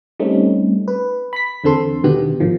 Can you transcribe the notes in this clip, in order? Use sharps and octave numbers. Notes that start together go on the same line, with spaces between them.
G3 A3 C4 C#4 D#4
B4
B5 B6
E2 D3 C4 A4 C6
B2 D3 D#3 B3 G4
G#1 D#3 F3